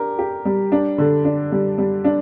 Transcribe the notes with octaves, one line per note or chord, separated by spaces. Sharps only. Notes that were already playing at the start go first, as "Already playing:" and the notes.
Already playing: D4 G4 A#4
G4
G3
D4
D3
D4
G3
G3
D4